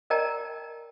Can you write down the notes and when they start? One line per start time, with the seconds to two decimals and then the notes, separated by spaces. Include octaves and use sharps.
0.10 A#4 D5 D#5 G5 A5 A#5